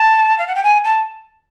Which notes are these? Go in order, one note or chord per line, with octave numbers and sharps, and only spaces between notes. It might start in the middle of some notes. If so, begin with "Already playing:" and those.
Already playing: A5
F5
F#5
G5
G#5
A5